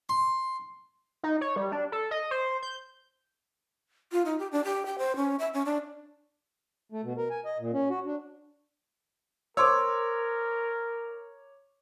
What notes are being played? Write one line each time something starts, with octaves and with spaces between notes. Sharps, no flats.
C6
D#4
C#5
G3
D4
A4
D#5
C5
G6
F4
D#4
G4
D4
G4
G5
C5
C#4
E5
C#4
D4
A3
B2
A#4
G#5
D#5
A#2
C#4
F#4
D4
A#4 C5 C#5 C6 D6 E6